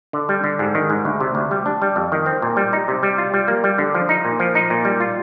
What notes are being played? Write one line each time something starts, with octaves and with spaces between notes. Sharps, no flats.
D3
G3
D3
G#2
D#3
G#2
D2
C3
D2
G3
D4
G3
F2
D#3
C4
A#2
G3
D#4
C3
G3
F4
G3
A#3
G3
D3
F3
D#4
A#2
F3
D#4
A#2
G3
F4